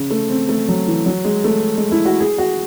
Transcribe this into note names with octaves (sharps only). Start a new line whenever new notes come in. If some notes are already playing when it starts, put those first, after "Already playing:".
Already playing: C#3
A3
C4
A3
F#3
E3
F#3
G#3
A3
G#3
E4
F#4
G#4
F#4